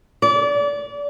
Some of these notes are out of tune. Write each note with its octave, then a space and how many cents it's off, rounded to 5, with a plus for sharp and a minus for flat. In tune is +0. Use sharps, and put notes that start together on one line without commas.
D5 -30